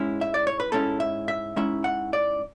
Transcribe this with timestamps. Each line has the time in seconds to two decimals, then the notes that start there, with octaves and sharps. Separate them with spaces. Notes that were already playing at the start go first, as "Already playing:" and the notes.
Already playing: G#2 G#3 C#4 E4
0.21 E5
0.34 D5
0.47 C#5
0.60 B4
0.72 G#2 G#3 C#4 E4 A4
1.00 E5
1.28 E5
1.56 G#2 G#3 C#4 E4 E5
1.84 F#5
2.13 D5